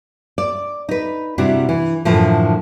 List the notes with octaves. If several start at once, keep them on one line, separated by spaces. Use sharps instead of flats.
D5
D#4 B4
C3 G3 D4 E4 F#4
E3
F#2 A2 D3 E3 F3